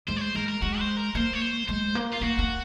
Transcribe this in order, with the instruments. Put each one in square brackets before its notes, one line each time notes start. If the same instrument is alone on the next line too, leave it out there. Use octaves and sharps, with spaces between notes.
[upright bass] G#3 [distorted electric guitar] C5
[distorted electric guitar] C#5
C5
[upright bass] G#3 [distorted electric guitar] A#4
[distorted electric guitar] A#4
[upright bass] G#3 [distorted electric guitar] F#4
[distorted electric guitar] C5
A#4
[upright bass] A#3 [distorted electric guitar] C5
[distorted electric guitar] C#5
C5
[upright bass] G#3 [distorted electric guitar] C5
[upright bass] A#3
[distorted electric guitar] F4
[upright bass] A#3 [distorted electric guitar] F#4
[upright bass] A#3